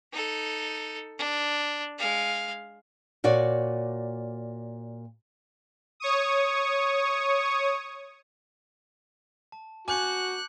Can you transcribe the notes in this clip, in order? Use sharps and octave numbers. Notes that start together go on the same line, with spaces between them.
D#4 A4
D4
G#3 F5
A#2 F#4 C#5 D5
C#5 C#6 D#6
A5
F#4 G#5 D6 F#6 G6 C#7